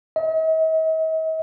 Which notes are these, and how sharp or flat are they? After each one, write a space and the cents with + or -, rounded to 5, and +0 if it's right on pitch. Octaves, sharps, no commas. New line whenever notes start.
D#5 +45